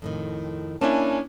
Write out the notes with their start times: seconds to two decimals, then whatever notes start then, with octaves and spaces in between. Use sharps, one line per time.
0.02 F2 A2 D#3
0.81 A#3 C#4 D4 E4 G#5 A5